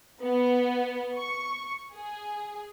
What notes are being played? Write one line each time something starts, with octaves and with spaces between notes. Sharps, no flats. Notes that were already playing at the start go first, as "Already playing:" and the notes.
B3
C#6
G#4